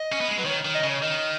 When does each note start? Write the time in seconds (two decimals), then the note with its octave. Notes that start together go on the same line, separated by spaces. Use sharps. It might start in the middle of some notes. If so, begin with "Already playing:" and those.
Already playing: D#5
0.12 C#4
0.21 B3
0.28 G#3
0.37 F#3 B4
0.45 D#3 C#5
0.65 D#3
0.75 D#5
0.84 C#3
0.89 C#5
1.02 D#3 D#5